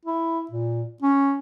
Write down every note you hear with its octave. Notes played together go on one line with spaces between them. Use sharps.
E4
A#2
C#4